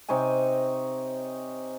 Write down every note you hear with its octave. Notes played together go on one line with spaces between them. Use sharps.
C3 D#4 C#5 G#5